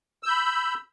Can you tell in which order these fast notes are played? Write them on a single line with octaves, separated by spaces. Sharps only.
E6 G6 B5